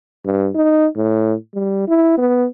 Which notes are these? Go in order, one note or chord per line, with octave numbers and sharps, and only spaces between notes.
G2
D#4
A2
G3
E4
B3